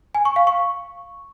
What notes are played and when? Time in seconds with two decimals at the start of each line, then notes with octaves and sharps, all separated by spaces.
0.15 G#5
0.25 C#6
0.36 F5
0.47 C#6